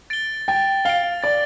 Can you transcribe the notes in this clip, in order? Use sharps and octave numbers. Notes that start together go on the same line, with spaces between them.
A6 D7 G7
G5 A6
F5 D7 G7
D5 A6